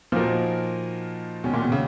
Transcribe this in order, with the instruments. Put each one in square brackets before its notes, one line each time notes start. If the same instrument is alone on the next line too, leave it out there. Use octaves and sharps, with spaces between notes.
[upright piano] A#2 [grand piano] F3 A#3 D#4 F#4 A#4
[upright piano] B2 [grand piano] D#3 G#3 C#4
[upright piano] A#2
B2
C#3